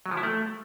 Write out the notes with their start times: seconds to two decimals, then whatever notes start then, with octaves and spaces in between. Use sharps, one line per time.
0.06 F#3
0.11 F3
0.17 E4
0.23 A3